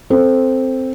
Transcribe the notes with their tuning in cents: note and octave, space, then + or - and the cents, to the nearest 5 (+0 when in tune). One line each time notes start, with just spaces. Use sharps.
C4 +0 A4 +0